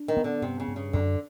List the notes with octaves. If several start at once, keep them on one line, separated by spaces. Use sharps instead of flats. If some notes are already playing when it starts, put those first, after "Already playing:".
Already playing: D4
D#3
B3
D3
G2 C3
C#3
G2
C#3
F#2 D3